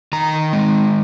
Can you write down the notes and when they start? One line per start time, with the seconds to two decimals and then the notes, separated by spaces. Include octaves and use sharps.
0.13 D#3 A#5
0.53 G#3